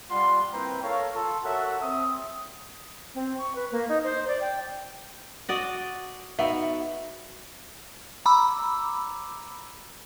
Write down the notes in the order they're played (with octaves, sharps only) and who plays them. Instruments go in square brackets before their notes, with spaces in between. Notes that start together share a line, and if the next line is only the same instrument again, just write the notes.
[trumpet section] G3 F4 D5 F#5 C6
A#3 C4 E4 B4 G5 A#5
A4 A#4 C#5 F5 A#5 C#6
F4 A4 A5
F#4 A4 A#4 C#5 E5 F#5
C4 E5 D#6
[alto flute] C4
C#6
B4
A#3
D#4
C5
D5
G5
[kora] F#4 D5 D#5
[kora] B3 [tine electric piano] D#4 F#4 [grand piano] E5
[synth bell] A#5 B5 D6 E6